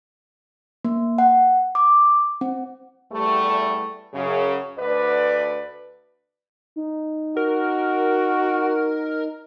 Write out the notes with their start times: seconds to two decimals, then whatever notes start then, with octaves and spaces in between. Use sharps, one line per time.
0.85 A#3
1.18 F#5
1.75 D6
2.41 C4
3.12 E2 G3 A3
4.14 F#2 C#3
4.78 D2 B4 D5
6.76 D#4
7.37 F#4 A#4